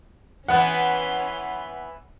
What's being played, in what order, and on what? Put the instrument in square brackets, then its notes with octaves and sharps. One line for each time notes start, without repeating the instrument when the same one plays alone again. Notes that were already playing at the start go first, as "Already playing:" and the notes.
[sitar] E3 B3 [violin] C#4 C6 [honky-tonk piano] F#5